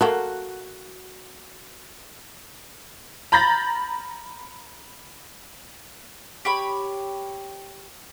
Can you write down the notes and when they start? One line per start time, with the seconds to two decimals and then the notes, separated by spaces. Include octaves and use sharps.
0.01 F#3 A3 A#3 F#4 F#5
3.32 A#5 B5 G6 A6 A#6
6.45 G4 C#5 B5